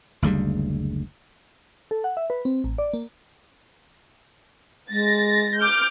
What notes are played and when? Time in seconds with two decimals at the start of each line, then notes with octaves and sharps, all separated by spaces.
0.22 F#1 D2 C#3 G3
1.91 A4
2.04 F#5
2.17 E5
2.30 B4
2.45 C4
2.64 A1
2.78 D5
2.93 A#3
4.90 G#3 A6 A#6
5.59 D6 F6 G6